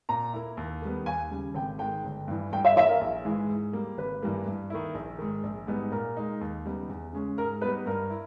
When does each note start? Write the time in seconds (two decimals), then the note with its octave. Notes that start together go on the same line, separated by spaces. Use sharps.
0.09 A#2 A#5
0.33 A#3 E4
0.57 D#2
0.82 D#3 G3 B3
1.06 D#2 G#5
1.31 C#3 G3
1.54 G#1 G5
1.79 G#2 D#3 G#3 G5
2.04 G1
2.28 G2 E3
2.53 G2 G5
2.65 E5
2.76 E3 E5
2.80 A#3
2.89 A#4
3.01 A#1
3.25 G#2 E3 G#3
3.49 G#2
3.73 G3 A#3
3.98 G#1 B4
4.22 G2 E3 G3 A#3
4.46 G2
4.70 D#3 A#3 E4
4.95 A#1
5.19 G#2 D#3
5.44 A#1
5.67 G#2 G3 B3 D#4
5.91 A#2 A#4
6.17 G#3 D#4
6.41 D#2
6.65 C#3 G3 B3 D#4
6.89 E2
7.13 C#3 G#3 C#4
7.37 G#2 A#4
7.61 G3 B3 D#4 B4
7.86 G2 A#4
8.10 E4